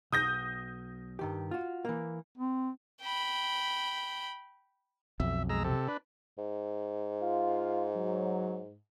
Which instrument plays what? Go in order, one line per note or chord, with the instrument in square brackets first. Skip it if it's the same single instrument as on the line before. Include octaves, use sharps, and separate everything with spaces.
[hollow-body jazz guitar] B1 [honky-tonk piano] D#6 G6 A#6
[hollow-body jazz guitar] G2 D#3 G4
F4 F#4
E3 A#3
[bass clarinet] C4
[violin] G5 B5
[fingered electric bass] B1 F2 [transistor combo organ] E5
[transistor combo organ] G#3 A#5 E6
C3 A4
D4 B4
[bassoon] G#2
[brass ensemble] F4 F5
F#3